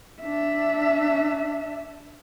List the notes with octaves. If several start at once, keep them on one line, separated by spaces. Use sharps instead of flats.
D4 E5